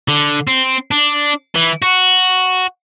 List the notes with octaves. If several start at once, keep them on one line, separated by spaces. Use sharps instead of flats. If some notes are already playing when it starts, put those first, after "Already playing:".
D3
C4
D4
E3
F#4